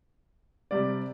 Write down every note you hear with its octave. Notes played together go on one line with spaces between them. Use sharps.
C3 G3 D5